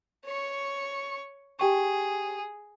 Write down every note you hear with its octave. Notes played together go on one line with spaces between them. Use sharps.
C#5 C#6
G4 G#4 G5 C#6